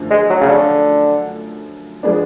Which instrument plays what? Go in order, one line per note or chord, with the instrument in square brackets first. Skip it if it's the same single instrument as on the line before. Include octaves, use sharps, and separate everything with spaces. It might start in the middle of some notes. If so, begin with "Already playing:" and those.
Already playing: [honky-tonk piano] F#2 D3 F3 A3
[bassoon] G#3
F#3
C#3
D3
[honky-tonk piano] F3 G#3 B3 D4